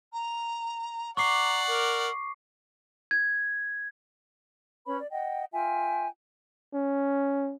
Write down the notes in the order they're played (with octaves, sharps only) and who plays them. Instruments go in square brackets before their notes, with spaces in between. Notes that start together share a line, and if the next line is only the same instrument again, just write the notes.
[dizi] A#5
[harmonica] D5 F#5 [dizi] A#5 [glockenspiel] C#6 D6 C7
[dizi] A#4
[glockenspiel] G#6
[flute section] C#4 B4 C#5 B5
D5
D#5 F#5 G5
F4 E5 G5 G#5
[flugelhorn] C#4